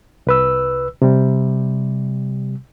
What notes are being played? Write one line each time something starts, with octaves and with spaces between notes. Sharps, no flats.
C2 B4 E6
C3 G3